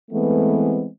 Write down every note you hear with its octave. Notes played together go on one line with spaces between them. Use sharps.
E3 G#3 A3 B3 C4